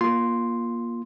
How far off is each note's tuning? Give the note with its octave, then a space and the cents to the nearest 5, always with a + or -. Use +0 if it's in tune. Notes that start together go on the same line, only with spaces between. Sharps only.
A#3 +25 F4 +0 C6 +0